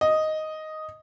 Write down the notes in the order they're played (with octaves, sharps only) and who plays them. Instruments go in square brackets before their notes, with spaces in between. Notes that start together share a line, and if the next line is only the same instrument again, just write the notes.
[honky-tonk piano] D#5